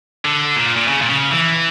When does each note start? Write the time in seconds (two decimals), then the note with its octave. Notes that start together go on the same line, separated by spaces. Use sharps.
0.25 D3
0.56 A#2
0.77 A#2
0.88 C#3
1.02 A#2
1.09 C#3
1.31 E3